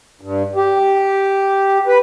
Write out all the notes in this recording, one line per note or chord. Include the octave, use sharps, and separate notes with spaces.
G2
G4
B4